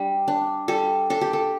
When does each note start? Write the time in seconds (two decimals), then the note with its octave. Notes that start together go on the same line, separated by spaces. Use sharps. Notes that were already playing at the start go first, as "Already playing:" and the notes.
Already playing: G3 D4
0.28 D4
0.68 G3 A4
1.10 D4 A4
1.21 G4
1.33 A4